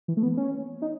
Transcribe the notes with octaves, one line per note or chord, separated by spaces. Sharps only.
E3
A3
B3
C#4
D#4